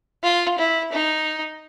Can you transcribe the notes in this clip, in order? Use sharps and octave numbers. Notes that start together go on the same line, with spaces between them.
F4
E4
D#4